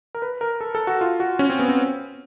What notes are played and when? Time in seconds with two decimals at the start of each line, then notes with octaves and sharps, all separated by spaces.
0.15 A#4
0.22 B4
0.41 A#4
0.61 A4
0.75 A4
0.87 F#4
1.01 F4
1.20 F#4
1.39 C#4
1.50 C4
1.60 B3
1.69 C4